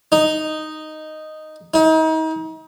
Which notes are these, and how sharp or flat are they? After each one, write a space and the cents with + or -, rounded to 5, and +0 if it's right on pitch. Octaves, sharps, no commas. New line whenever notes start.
D#4 -5
D#4 +35